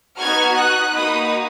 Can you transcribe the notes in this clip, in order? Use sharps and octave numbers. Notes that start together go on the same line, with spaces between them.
B3 D#4 F#4 F6 G#6
D#6 F#6
A#3 D#4 F#4 B5 D#6